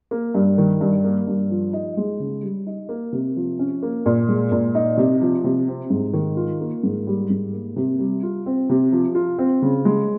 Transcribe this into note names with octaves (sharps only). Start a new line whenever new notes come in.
A#3
G2
D#3
G2
A#3
G2
F3
D#4
G#3
C#3
G3
D#4
A#3
C3
F3
C#4
A#3
A#2
G#3
A#2
D#4
C3
F3
C3
C4
G#2
D#3
F4
A#3
G#2
G3
G#2
A#3
C3
G3
F4
C4
C3
F3
F4
C4
C#3
G#3